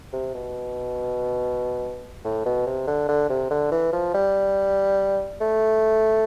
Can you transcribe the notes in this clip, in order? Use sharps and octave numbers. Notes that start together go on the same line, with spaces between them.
C3
B2
A2
B2
C3
D3
D3
C3
D3
E3
F3
G3
A3